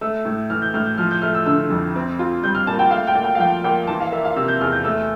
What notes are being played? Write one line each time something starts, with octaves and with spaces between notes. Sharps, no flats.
A3 E6
A2
E3 F6
G6
A2 F6
G6
F3 F6
G6
A3 F6
E6
D3 E6
F2
C4
F4
G3 G6
F6
A#2 A5
G5
A3 F5
G5
A#2
G5
F5
F3 G5
A#2 G5
E3 A5
F5
A#3 E5
F5
C3 E6
G6
E2 F6
G6
A3 E6